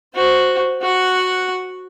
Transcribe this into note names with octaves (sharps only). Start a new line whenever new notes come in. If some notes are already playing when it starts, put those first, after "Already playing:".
F#4 C5
F#4 F#5